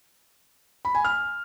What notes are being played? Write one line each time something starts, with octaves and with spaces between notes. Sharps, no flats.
B5
G#5
F6